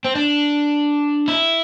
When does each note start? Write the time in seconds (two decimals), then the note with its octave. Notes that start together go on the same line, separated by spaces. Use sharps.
0.05 C4
0.15 D4
1.28 E4